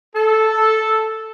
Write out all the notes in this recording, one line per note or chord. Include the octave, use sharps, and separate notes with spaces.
A4